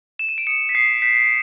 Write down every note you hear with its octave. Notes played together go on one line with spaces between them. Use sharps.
E7
D#7
D7
D#6 C#7
B6
D#6 C7
G6 B6